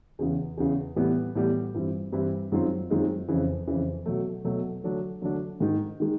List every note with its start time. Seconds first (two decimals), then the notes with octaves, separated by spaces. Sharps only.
0.19 E2 C#3 E3
0.57 E2 C#3 E3
0.96 A2 E3 G3 B3
1.35 A2 E3 G3 B3
1.74 G2 E3 G3 C4 E4
2.12 G2 E3 G3 C4 E4
2.52 F#2 D#3 G#3 C4 F4
2.90 F#2 D#3 G#3 C4 F4
3.28 F2 C#3 E3
3.67 F2 C#3 E3
4.06 B2 F#3 A3
4.45 B2 F#3 A3
4.84 D3 F#3 A3 D4
5.22 D3 F#3 A3 D4
5.60 G#2 D#3 G#3
6.00 D#3 G#3